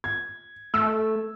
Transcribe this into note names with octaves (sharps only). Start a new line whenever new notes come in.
G#6
A3 E6